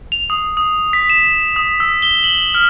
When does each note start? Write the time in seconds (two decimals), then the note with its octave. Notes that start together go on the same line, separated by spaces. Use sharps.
0.12 F7
0.30 D#6
0.57 D#6
0.93 B6
1.10 E7
1.56 D#6
1.80 E6
2.02 G7
2.24 F#7
2.54 F6